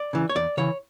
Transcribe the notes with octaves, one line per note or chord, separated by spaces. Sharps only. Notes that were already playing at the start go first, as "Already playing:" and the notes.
Already playing: D5
C#3 E3
C#5
E2 D5
C#3 E3 C#5